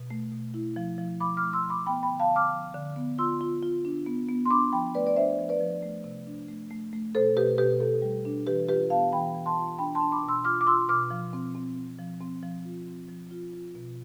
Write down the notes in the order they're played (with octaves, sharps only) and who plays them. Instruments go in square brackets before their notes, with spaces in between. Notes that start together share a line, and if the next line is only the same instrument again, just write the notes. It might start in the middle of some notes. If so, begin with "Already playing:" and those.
Already playing: [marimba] B2
A3
B2
E4
F3
F3
F3 B5 D6
D6 F6
A3
C6 E6
F3
B5 D6
B3 G5 B5
G5 B5
D3
F5 A5
D3
D6 F6
F3
D3
B3
F4 C6 E6
F4
F4
D4
B3
B3
C6
D4 B5 D6
F3 G5 B5
A3 B4 D5
D5
D4 C5 E5
F3
B4 D5
F3
A3
C3
D4
A3
A3
A3
B2 A4 C5
B2 G4 B4
B2 G4 B4
B2 A4
G3
D4
E3 G4 B4
F4 G4 B4
B3 F5 A5
E3 G5 B5
E3
A5 C6
F4
D4 G5 B5
A5 C6
D4
B5 D6
B2
C6 E6
F4 D6 F6
D6
F4 C6 E6
B2 D6 F6
F3
C4
C4
C4
F3
C4
F3
F4
C4
F3
F4
F4
B2